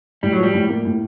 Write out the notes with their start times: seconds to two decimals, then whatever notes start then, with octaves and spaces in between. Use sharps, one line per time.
0.23 A2 G3
0.33 F#3
0.38 F3 G3
0.54 A2
0.69 A#3
0.85 A2